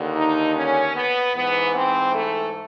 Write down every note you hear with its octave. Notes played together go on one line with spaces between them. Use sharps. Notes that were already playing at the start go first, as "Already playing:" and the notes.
Already playing: D#2 D3
D#4
C#4
B3
G#2 E3 B3
C4
A3